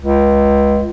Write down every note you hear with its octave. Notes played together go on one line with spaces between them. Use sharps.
C#2